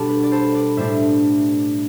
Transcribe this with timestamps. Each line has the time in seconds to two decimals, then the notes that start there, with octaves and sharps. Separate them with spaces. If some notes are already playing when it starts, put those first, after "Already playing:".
Already playing: B2 G3 B3 D4 A4
0.09 B4
0.23 D5
0.32 A4 C5
0.54 B4 D5
0.77 A2 G3 D4 C5 E5